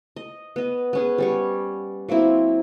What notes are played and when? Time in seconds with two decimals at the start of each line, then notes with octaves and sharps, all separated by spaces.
0.16 D#5
0.56 B3 D#5
0.93 B3 C#4 G#4
1.18 G3 C#4 C#5
2.09 F#3 A#3 C4 E4